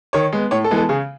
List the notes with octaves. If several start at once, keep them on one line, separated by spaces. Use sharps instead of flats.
D#3 C#5
G#3 B3
A2 C#5
A4
E3 G#3 B3
A4
C#3 G#4